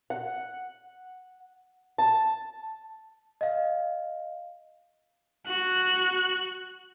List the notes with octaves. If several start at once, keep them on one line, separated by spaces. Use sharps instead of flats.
F#5
A5
D#5 F5
F#4 F#6